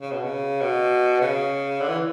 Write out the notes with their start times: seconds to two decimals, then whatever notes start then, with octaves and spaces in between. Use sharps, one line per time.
0.01 C#3
0.12 B2
0.23 C#3
0.61 B2
1.21 C#3
1.80 D3
1.89 E3